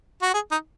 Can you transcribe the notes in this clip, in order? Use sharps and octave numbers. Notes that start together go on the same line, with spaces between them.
F#4
G#4
D#4